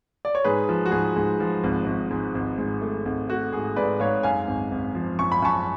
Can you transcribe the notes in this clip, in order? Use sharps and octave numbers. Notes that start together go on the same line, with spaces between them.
D5
C#5
G#2 G#4 B4
F3
F#4
G#2 G#4
G#2
F3
G#1
G#1
G#2
G#1
G#2
A3
G#1
A3 F#4
G#2 G#4
G#2 B4 D5
G#2 C#5 F5
F#2 F5 G#5
G#1
G#1
F3
F#2 C#6
B5
F#2 A5 C#6